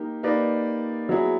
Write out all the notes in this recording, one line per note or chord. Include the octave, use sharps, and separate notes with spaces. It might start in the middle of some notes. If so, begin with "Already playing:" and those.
Already playing: A#3 D#4 G4
A#3 D#4 G4 B4 D5
F#3 B3 E4 G#4